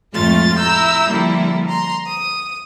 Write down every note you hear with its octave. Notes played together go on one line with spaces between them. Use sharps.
F2 A2 G#3 A3 F4 A6
E4 A#5 E6 G6
D3 F3 G3 A#3 E4
A#5 C6
D#6